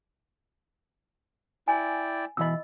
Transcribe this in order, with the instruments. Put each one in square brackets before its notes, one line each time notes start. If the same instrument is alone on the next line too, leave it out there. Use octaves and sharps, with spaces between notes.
[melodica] E4 D5 G5 [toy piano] G#5
[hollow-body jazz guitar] B2 E3 B5 [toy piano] D#5 E6